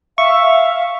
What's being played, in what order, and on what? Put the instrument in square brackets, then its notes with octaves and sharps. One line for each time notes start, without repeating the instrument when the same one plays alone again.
[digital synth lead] E5 [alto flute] F5 [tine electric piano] C#6